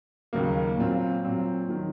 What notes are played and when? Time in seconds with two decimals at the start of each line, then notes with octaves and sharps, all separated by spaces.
0.33 D#2 C#3 F#3 A#3
0.77 A#2 F#3 C4 F4
1.22 A#2 F#3 C4 F4
1.69 D#3 F#3